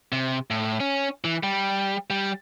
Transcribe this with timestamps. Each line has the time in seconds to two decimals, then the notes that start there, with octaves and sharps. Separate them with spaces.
0.12 C3
0.50 A2
0.80 C#4
1.24 E3
1.43 G3
2.10 G3